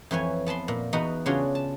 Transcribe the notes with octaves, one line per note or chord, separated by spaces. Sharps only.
F2 E3 C#5 G#5
B3 A5 B5 C6
A#2
E2 B3 D#4 F#4 F#5 B5
C#3 D4 F4 F#4 G#4 C#5
A5